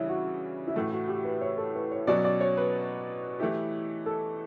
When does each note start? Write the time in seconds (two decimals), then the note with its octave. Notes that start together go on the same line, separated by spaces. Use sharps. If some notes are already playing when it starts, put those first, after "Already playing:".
Already playing: C#3 E3 G3 D4 E4 C#5
0.09 F#4
0.68 E4
0.75 A2 E3 A3 F#4
0.92 F#4
1.08 G4
1.24 B4
1.41 C#5
1.58 A4
1.75 B4
1.91 C#5
2.07 B2 F#3 C#4 D5
2.24 D5
2.41 C#5
2.57 B4
3.39 E3 A3 E4 G4
4.06 A4